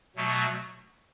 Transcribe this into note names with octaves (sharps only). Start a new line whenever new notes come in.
B2 F#3 A3 F#4